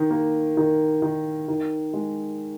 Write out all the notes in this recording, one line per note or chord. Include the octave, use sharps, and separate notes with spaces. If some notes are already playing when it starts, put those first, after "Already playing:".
Already playing: D#3
A#3
D#3
D#3
D#3
G#3